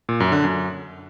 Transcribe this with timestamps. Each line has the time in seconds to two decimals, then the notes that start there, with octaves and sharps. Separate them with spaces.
0.09 A#2
0.20 F#2
0.32 D3
0.44 F#2